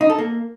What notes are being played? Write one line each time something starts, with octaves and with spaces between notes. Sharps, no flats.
D#4
A4
A#3